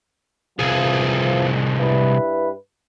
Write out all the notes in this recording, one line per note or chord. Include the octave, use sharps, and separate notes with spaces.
C2 E3 F3 G#3
G2 E4 B4